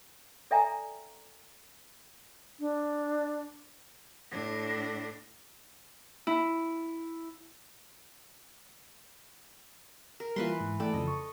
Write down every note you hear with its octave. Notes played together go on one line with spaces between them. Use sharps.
A4 D5 E5 G5 G#5 A#5
D4
A2 D4
E4
A#4
E3 G3 A#3 F4 B4 C6
G#2
E3 A3 A4 D5 G5
F2 C#3 F3 D#5
C#6